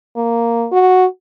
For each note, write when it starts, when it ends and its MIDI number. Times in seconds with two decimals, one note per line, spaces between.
0.16 0.67 58
0.72 1.06 66